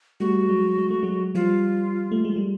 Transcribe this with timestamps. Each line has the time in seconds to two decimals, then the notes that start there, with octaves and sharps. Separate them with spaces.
0.20 G3 A3 F#4
0.49 F#3 G#3
0.78 G#3
0.90 A3
1.03 F#3 G#3
1.35 F3 G3 F4
2.12 A3
2.25 G#3
2.36 G3